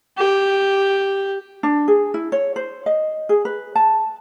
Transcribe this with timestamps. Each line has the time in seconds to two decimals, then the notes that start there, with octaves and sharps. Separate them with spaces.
0.18 G4
1.63 D4
1.88 G#4
2.14 E4
2.32 C#5
2.56 C5
2.86 D#5
3.29 G#4
3.45 B4
3.75 A5